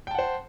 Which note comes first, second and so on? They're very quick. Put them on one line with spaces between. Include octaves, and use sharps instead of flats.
G5 A5 F#5 C5